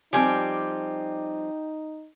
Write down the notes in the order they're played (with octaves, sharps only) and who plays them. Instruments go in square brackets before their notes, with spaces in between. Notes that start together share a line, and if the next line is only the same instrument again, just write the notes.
[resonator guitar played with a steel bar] F3 G3 C4 [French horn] D#4 [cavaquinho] G4 G#5 D6